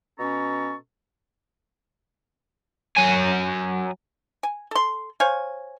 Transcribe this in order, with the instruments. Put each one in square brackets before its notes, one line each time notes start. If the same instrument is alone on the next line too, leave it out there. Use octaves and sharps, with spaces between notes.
[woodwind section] B2 C#4 A4 A#5 C#6
[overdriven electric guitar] F#3 G#5
[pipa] G#5
A4 C6
C5 C#5 F5 G#5